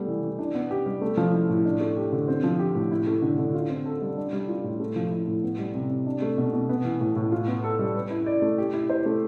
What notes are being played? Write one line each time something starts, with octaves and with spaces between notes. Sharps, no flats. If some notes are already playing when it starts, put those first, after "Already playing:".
Already playing: G3 A3 B3
E3
E3
D4
B3
G4
G3
A3
F3
E4
A2
D4
A3
G4
D3
C4
F3
G4
A2
E4
A3
D3
D3
F4
C4
A4
G3
D4
G3
F4
A2
A3
F3
E4
A2
B3
G3
C3
C3
D4
A3
B2
B2
B3
E3
A2
A2
F4
B3
A4
G3
B4
E4
D5
A3
G4
E4
C5
A3